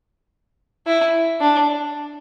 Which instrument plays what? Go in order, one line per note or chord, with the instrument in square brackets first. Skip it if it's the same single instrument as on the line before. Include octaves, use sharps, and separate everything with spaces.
[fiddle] E4
D4